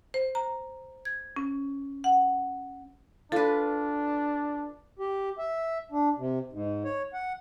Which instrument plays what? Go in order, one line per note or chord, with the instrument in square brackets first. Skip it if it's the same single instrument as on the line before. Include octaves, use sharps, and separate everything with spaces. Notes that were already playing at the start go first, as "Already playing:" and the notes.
[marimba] C5
A#5
G#6
C#4
F#5
[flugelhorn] D4 [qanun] F4 B4 [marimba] A4
[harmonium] G4
E5
D4
C3
G#2
C#5
F#5